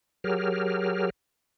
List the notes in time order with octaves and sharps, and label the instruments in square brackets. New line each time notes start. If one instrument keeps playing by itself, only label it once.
[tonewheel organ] F#3 G4 G#4 A#4 F6